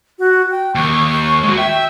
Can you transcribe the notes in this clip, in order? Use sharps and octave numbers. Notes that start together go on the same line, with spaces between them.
F#4
G5
D#2 C#6
G#3 F#4
E5 G5